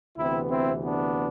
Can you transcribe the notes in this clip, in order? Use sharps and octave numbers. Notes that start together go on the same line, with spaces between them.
D2 C3 E3 B3 C4 E4
C4 E4
B3 D4